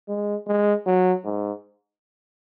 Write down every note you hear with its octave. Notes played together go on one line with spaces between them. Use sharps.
G#3
G#3
F#3
G#2